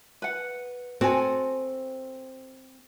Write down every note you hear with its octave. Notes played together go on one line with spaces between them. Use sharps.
B4 F#5
C4 F#4 A4 G#5